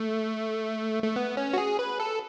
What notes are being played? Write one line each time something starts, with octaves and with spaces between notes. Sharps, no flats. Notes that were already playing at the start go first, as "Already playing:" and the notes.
Already playing: A3
A3
B3
C#4
F#4
G#4
B4
A4